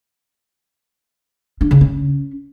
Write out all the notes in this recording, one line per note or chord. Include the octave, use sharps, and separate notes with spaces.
D4
C#3
C#4